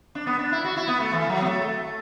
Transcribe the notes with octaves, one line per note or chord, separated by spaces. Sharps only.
D4
B3
D4
E4
F#4
E4
B3
A3
E3
F#3
B3
A3
A3